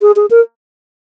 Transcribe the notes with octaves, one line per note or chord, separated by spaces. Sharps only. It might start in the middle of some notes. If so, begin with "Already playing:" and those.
G#4
G#4
A#4